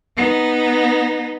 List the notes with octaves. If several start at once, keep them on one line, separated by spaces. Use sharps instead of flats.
B3 D#4